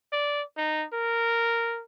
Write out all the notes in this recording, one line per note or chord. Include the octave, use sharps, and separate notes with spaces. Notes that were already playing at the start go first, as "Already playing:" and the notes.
D5
D#4
A#4